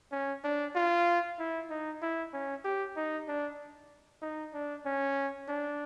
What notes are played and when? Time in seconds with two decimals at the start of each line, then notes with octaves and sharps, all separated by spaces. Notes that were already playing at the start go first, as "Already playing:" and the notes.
0.12 C#4
0.44 D4
0.76 F4
1.39 E4
1.70 D#4
2.02 E4
2.33 C#4
2.65 G4
2.96 D#4
3.28 D4
4.22 D#4
4.54 D4
4.86 C#4
5.49 D4